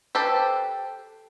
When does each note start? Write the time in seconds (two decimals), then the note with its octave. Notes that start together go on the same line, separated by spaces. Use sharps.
0.15 G4 A4 B4 C5